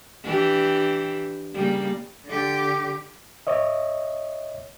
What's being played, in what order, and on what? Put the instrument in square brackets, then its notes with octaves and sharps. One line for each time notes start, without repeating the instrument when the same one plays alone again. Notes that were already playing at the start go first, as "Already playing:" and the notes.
[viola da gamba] E3 D4 G4
C#3 G3 A#3
[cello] D3 G4
[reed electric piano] C#5 D#5 E5